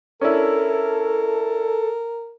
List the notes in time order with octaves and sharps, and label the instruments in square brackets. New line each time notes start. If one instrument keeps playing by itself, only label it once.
[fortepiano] C#4 D4 E4 [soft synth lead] A4 [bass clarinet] A#4